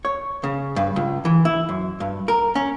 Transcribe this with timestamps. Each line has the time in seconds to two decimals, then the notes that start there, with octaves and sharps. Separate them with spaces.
0.05 C#5
0.44 C#3
0.76 G2
0.96 C#2
1.25 E3
1.45 E4
1.69 F#2
2.00 G2
2.28 A#4
2.55 C#4